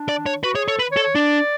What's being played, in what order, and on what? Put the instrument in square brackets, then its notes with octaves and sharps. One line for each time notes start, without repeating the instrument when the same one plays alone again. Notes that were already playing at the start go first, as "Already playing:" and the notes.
Already playing: [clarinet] D4
[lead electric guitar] D5
C#5
[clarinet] F#4 [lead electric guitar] B4
[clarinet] G#4 [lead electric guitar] C#5
[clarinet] A4 [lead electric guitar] C#5
[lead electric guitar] B4
[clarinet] C#5
[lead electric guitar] A4
[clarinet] C#5
[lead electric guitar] D4 [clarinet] D5